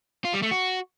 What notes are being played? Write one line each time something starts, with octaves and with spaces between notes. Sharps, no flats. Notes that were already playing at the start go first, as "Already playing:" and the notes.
F4
G3
A3
F#4